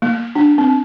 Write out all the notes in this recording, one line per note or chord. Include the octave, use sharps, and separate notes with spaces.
A#3
D4
C4